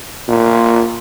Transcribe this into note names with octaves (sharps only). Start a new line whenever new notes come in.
A#2